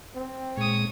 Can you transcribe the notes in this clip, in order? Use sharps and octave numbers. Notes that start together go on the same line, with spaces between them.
C4
A#2 G#3 C#5 D#6